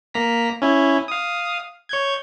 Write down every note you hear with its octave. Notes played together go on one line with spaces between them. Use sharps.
A#3 A#5 B6
C#4 E4
F5 D#6
C#5 G6 G#6